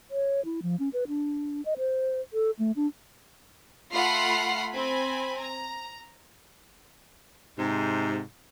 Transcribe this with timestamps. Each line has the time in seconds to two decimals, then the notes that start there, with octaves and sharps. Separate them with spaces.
0.11 C#5
0.45 E4
0.63 F3
0.79 C#4
0.93 B4
1.08 D4
1.65 D#5
1.78 C5
2.33 A4
2.59 A3
2.76 D4
3.92 A3 F4 F#5 B5 F6 C7
4.72 C4 G#5 B5
5.37 A#5
7.59 G#2 C3